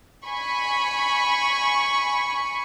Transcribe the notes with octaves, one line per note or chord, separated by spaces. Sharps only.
G#5 B5 C#6